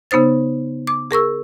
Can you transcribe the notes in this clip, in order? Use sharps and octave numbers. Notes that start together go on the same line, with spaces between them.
C#3 B3 D#4 C5 A6
D6
G#4 A#4 C#6 E6